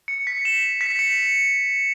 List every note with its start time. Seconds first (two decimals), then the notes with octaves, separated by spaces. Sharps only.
0.08 C#7
0.27 B6
0.45 E7
0.81 B6
0.99 C#7